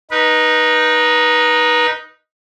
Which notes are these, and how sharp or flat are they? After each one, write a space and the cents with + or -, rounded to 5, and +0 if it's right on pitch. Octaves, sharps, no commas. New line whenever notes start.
D#4 +0 B4 -25